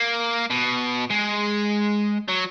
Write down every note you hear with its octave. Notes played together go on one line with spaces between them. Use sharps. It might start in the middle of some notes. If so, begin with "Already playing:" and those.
Already playing: A#3
B2
G#3
F#3